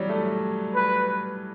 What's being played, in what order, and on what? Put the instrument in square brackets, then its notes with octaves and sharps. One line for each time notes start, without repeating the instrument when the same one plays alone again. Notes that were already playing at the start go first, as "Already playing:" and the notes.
Already playing: [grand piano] E3 F#3 G3
A3
[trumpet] B4